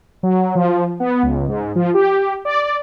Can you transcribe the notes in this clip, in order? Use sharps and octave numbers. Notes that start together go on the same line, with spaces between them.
F#3
F3
B3
C#2
G#2
F3
G4
D5